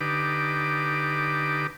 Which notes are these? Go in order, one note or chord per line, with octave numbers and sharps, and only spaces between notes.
D3 D#4 G4 B4 D6